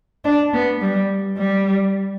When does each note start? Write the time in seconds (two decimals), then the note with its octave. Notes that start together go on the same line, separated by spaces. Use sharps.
0.25 D4
0.53 B3
0.81 G3
1.38 G3